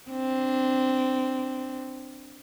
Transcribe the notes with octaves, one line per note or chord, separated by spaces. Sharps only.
C4 D4